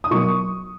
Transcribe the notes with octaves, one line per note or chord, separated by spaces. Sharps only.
D#6
B2 F#3 A#3 C#6